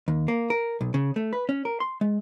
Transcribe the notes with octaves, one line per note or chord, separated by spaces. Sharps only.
D#2
A#3
A#4
B1
C#3
A3
B4
C#4
A#4
C6
G#3